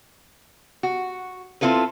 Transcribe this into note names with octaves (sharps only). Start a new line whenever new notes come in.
F#4
C4 E4 F4 A4 B4